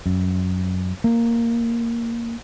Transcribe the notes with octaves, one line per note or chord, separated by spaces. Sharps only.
F#2
A#3